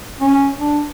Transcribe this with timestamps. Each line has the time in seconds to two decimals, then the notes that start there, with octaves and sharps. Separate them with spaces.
0.21 C#4
0.60 D4